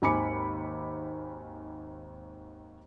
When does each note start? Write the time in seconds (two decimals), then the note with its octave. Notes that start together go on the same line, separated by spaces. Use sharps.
0.02 G#1 D#2 G#5 B5 D6 C#7